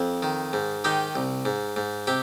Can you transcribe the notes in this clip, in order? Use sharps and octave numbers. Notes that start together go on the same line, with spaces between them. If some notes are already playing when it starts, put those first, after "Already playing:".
Already playing: F2
D#3
G#2
D#3 D#4 G4
C2
G#2
G#2
C3 G4